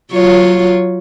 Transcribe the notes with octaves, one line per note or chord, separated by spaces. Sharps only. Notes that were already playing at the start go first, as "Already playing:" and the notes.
F#3 F4 C#5